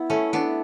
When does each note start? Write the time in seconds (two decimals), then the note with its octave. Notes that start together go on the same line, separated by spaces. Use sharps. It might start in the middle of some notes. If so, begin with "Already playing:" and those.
Already playing: B3 E4
0.10 A3 C#4
0.33 B3 D4